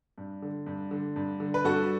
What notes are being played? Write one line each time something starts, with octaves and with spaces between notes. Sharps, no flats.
G2
D3
G2
D3
G2
D3
B4
G2 F#4 A4